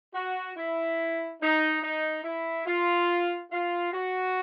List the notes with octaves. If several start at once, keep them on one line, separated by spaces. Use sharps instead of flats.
F#4
E4
D#4
D#4
E4
F4
F4
F#4